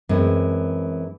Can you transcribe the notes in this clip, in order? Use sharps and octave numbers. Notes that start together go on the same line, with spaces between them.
F#2 E3 G#3 A3 C4